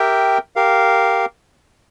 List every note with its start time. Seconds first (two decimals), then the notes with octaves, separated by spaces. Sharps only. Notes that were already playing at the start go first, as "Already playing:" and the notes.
Already playing: G4 A#4 E5 G5
0.56 G4 A#4 F5